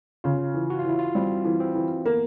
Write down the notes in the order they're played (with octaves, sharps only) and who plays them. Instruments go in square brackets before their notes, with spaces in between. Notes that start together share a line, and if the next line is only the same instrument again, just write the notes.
[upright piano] C#3 [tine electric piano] F4
[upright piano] E3
[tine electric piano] F#4
F4
[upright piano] E3 [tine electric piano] E4
[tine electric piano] F4
[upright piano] G3 [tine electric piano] C4
[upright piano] E3
[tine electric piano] C4
[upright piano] E3
[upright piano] A#3 [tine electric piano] B3